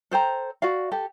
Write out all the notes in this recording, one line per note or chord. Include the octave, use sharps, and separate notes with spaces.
A4 C5 G5 A#5
F#4 D5 F5
G4 A4